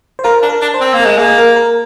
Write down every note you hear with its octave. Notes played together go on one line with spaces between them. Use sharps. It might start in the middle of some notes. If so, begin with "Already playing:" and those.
C5
F4 A#4
D4
A#4
D4
C5
C4
A#3
A#4
G#3
A#3 G#4
A#4
A#4